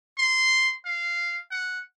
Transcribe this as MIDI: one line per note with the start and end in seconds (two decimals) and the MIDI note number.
0.18 0.73 84
0.86 1.40 77
1.51 1.80 78